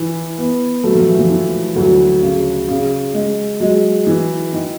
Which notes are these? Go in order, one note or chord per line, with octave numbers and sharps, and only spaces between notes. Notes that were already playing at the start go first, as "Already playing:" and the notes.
Already playing: E3
B3
F#3 A3
F3
E3
F3
E3
D2 F#3
C#3
C#3
G#3
F#3 G#3
E3
D#3